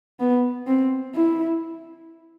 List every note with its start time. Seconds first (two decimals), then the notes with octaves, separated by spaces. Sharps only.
0.20 B3
0.66 C4
1.15 E4